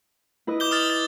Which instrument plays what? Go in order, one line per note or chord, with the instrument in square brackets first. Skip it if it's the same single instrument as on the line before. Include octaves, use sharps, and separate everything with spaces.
[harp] E4 B4 D#5
[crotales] D6 G6 G7
D#6 F6 A6
A6